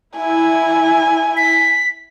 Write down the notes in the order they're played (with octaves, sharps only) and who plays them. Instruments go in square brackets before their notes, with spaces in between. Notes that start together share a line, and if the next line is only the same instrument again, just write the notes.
[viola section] E4 [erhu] G#5
[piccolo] B6